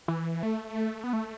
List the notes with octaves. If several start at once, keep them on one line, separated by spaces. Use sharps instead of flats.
E3
A3
B3
A3